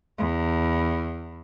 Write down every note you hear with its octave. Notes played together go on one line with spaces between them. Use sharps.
E2